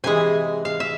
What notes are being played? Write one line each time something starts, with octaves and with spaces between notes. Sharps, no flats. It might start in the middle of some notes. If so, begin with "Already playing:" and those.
C3 E3 G#3 G#5
F5
E5